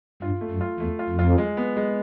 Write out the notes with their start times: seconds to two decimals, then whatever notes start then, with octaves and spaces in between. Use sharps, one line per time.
0.22 G2 F4
0.41 A3
0.51 F#2
0.61 F4
0.79 E2 A3
0.99 F4
1.09 F2
1.19 F4
1.38 G#3
1.57 B3
1.77 G#3